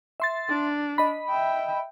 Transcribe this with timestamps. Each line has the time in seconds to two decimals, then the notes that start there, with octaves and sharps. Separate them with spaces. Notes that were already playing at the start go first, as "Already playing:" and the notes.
0.20 E5 C6 A6
0.49 D4
0.98 D#5 B5
1.30 E5 G5